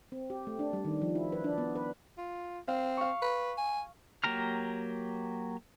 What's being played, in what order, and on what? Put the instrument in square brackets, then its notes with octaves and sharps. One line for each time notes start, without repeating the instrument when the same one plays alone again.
[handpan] C4
G4
A3
D4
G3
D#3
F3
E4
B4
D4
B3
B4
[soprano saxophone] F4
[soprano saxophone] C4 [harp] F5
[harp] F5 C#6
[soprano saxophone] B4
G#5
[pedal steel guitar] F#3 A#3 G4 A#5 F6